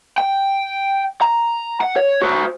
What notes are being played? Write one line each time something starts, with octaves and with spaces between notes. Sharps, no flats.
G5
A#5
F#5
C#5
F#4 C5